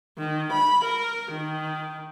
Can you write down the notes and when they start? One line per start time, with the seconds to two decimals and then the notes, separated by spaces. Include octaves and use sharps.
0.18 D#3
0.53 B5
0.85 A#4
1.32 D#3